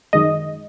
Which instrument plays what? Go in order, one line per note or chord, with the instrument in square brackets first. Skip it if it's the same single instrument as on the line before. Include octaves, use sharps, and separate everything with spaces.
[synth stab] F#2 D#3 G#3 D#5